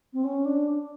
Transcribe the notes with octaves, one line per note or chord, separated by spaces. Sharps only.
C4
C#4
D4